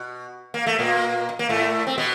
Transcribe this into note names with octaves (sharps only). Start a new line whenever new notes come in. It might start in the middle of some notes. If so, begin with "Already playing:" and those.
Already playing: B2
A#3
A3
A#2 A#3
A#3
A2 A3
C4
B2 B3